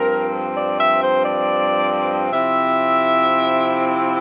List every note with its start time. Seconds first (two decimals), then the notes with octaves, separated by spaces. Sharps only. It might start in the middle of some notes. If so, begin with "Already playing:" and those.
Already playing: G2 F3 C4 A#4
0.55 D5
0.77 E5
0.99 C5
1.22 D5
2.31 C3 F3 C4 E4 E5